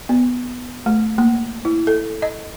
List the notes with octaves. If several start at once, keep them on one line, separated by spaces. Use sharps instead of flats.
B3
A3
A#3
E4
A4
D#5